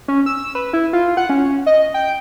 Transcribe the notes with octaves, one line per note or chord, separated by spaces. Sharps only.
C#4
E6
B4
E4
F4
F#5
C#4
D#5
G5